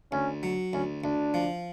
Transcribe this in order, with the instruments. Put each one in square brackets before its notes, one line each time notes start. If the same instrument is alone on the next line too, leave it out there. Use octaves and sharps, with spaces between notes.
[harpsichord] D2 [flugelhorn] C#4
[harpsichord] F#3
[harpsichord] D2 [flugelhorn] C#4
[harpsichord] D2 [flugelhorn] D4
[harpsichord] F3